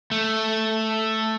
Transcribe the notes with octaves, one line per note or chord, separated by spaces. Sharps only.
A3